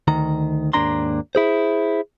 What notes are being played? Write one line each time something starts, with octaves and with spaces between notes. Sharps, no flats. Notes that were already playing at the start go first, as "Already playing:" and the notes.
D2 D#3 A#5
D#2 G#2 A#3 D4 A#5 C6
E4 G#4 C5